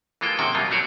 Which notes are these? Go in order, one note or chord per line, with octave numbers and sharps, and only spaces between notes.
E3 G#3 A#3 F4 A4 G5
F#2 C3 D#3 F#4 G5
B2 F#3 G3 A#3 D#4 F4
A3 D4 F#4 C#5 D5